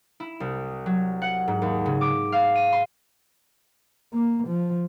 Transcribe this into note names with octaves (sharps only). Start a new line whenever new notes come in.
E4
C2
F#3
F#5
G#2
D#2
C#3
D6
F5
D#7
C6
A#3
F3